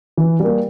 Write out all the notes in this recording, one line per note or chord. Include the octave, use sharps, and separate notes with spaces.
E3
G3 A#3